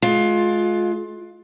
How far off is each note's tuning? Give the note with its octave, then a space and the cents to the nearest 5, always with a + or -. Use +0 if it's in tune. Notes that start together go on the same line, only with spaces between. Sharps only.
G#3 +35 F4 +15